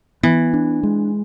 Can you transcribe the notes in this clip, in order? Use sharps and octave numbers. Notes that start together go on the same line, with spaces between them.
E3 B3
D4
G#3